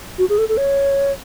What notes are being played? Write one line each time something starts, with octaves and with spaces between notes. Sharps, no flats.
F#4
G#4
A4
A4
C#5